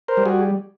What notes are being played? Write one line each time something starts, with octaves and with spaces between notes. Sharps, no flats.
A#4 C5
G3
F#4 G#4